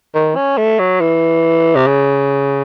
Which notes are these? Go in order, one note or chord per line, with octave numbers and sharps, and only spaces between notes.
D#3
C#4
A3
F#3
E3
C3
C#3